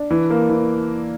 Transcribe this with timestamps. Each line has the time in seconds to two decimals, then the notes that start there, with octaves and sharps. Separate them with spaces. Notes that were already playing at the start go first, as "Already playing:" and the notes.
Already playing: D4
0.10 E3
0.30 A#3
0.50 E3